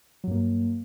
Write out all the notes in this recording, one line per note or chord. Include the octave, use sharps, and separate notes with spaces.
G2 F#3 A#3